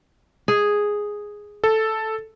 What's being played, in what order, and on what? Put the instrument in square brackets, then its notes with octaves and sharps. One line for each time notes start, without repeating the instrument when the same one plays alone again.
[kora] G#4
[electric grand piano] A4